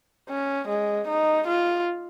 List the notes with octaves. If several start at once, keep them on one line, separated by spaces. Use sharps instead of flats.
C#4
G#3
D#4
F4